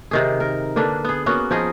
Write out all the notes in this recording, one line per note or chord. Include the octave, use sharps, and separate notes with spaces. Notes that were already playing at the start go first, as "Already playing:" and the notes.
C3 D#3 G#4
A#4
D3 A#3 D4 B4
B3 G#4
A#3 B3 C#4 F#4
F3 D#4 G#4 D#5